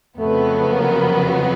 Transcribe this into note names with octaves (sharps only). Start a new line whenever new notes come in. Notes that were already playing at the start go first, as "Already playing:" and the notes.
F2 C#3 F#3 A3 B3
A#3